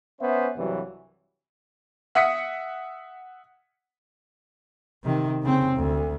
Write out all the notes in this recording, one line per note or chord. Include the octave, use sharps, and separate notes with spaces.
B3 C#4 C5 E5
C2 G2 E3 F#3
E5 F#5 D#6 B6 C#7
C3 D#3
C#3 C4
D2